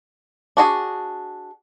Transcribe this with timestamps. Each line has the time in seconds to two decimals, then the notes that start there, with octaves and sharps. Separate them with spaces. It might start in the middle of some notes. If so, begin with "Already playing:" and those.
0.57 D4 F#4 G#4